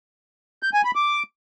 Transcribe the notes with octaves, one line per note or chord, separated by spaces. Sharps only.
G6
G#5
B5
D6